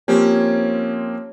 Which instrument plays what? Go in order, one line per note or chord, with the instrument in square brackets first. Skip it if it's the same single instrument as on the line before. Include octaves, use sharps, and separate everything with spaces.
[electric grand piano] F3 A#3 C4 [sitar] C#4 [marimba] G4